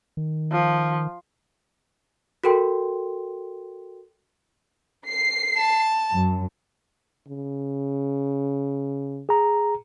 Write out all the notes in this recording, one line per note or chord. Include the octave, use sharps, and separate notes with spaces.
D#3
F3
F#4 A4 A#4 G5 C6
C7
A5
F#2
C#3
G#4 A#5